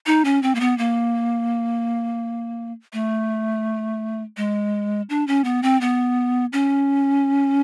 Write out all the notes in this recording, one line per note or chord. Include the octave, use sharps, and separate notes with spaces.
D#4
C#4
C4
A#3
B3
A#3
A3
G#3
D4
C#4
B3
C4
B3
C#4